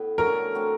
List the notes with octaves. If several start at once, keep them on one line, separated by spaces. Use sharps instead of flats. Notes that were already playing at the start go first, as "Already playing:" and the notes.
Already playing: A2 B3
D3 F#3 A3 C#4 A#4
F#3 A3 C4